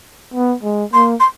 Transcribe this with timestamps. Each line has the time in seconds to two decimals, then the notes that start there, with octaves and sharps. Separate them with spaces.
0.34 B3
0.63 G#3
0.93 A#3 C6
1.20 C6